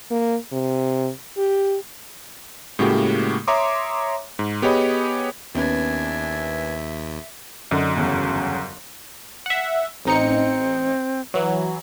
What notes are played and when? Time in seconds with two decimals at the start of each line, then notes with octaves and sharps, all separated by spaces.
0.11 A#3
0.52 C3
1.38 G4
2.79 A2 C#3 G#3 A#3 F#4 G4
3.47 C#5 E5 A#5 C6 D6 D#6
4.39 G#2
4.62 B3 G4 G#4 C#5 D#5 B5
5.55 D#2 B3 C#4 D4 B4 E5 G#5
7.71 F#2 D3 F#3 D#4
7.95 G1 E2 C#3
9.46 E5 F#5
10.05 A1 C4 D#4 C#7
11.34 E3 F#3